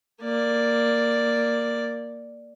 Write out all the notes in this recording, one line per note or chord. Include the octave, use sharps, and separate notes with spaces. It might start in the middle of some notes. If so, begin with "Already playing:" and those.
A#3 D5